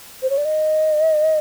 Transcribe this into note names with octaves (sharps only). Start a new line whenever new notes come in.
C5
C#5
D5
D#5